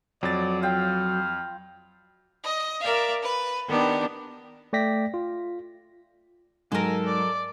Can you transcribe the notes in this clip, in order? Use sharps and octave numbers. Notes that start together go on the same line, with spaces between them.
F2 F#3 D5 A6
F4 F5 G5 F6
D#5
A#4 D5 E5 F5
B4
D#3 B3 D4 G4
A3 D5 G5 A#6 B6
F4
G#2 F#3 A4 A#4 G#5
D5